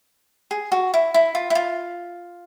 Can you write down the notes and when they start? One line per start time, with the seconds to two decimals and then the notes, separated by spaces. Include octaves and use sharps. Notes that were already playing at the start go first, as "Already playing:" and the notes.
0.51 G#4
0.72 F#4
0.94 E4
1.14 E4
1.35 F4
1.50 E4
1.55 F4